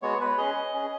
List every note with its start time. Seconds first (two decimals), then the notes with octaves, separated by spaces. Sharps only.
0.02 G#3 B3 F#4 C#5
0.21 B4
0.38 C#4 G#4 D#5
0.74 C#4 G#4